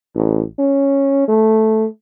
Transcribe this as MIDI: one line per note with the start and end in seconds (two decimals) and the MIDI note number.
0.15 0.44 33
0.59 1.25 61
1.28 1.86 57